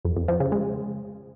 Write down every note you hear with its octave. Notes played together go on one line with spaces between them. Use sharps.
F2
F2
F3
C#3
G#3